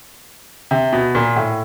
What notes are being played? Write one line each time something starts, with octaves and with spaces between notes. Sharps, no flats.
C3
B2
A#2
A2